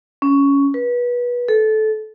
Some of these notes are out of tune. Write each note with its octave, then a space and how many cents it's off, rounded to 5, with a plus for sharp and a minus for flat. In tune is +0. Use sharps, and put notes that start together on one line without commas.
C#4 +10
B4 -25
A4 -20